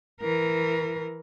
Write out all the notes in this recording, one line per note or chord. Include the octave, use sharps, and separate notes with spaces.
E3 A#4